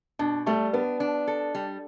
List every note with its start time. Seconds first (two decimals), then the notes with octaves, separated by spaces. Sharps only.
0.19 B2 D4
0.46 G3 A3
0.73 B3 D4
1.00 D4
1.28 A4
1.55 G3